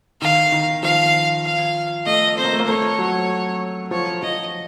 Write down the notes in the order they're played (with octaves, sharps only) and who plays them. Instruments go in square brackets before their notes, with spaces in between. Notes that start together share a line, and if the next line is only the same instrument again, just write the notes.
[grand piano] D#3 [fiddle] F5
[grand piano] D#3
[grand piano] F3 [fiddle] F5
[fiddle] F5
[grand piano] A3 [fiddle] D#5
[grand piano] C4 [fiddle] C5
[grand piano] A#3
A3
A#3
[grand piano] A3 [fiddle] C#5
[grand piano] F#3
[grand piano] F3 [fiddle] C#5
[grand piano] F3 [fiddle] D#5